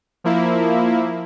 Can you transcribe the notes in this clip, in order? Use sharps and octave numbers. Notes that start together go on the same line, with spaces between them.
F3 A#3 E4